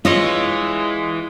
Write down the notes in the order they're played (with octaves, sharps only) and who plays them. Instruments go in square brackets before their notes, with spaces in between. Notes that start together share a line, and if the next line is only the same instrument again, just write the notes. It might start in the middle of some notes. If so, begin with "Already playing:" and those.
[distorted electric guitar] E3 [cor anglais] G#3 [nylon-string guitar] F4 [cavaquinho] C#5 D#5 E5